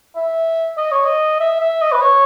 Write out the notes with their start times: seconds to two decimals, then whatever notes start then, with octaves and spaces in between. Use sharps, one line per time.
0.16 E5
0.78 D#5
0.92 C#5
1.05 D#5
1.40 E5
1.60 E5
1.81 D#5
1.92 B4
2.02 C#5